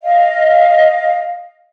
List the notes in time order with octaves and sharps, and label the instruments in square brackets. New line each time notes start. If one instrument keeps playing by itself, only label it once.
[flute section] D#5 F5